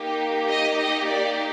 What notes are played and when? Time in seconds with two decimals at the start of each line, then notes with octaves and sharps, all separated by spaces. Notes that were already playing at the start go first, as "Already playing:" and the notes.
Already playing: A#3 D#4 G4
0.47 D#5
0.77 D#5
1.05 D5